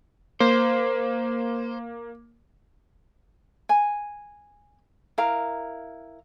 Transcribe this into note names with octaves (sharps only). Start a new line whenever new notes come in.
A#3 C5
G#5
E4 A#4 F5 A#5